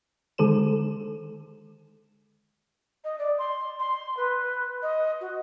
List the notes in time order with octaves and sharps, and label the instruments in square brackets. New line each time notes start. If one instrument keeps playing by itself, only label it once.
[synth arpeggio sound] D3 D#3 G#3 A4 C5 E7
[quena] D#5
D5
C6
C6
B4
D#5
F#4